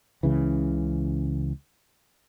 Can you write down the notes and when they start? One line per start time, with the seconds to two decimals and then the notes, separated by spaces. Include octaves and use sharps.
0.23 C#2 C#3 E3